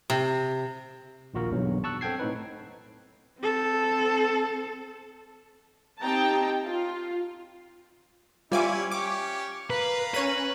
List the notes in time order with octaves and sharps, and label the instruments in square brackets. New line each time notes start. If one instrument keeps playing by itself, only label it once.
[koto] C3
[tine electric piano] A#1 D#2 F4 F#4 A#4
B1 E2 G2 B2 F#3 B3
A5 C#6 E6 F#6
C4 A4 F#5 G5 G#6 C7
A2 C4 D#4 B4
[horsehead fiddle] C4 A4
[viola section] C4 D#4 G4 G5 A5 A#5
F4
[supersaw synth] G3 G#5 D6 [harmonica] C#4 E4 [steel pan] F4 C5 E5
[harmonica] C#4 G4 [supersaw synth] D6
[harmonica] A#4 F5 [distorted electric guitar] B4
[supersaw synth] C#4 C#5 D#7 [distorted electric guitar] B4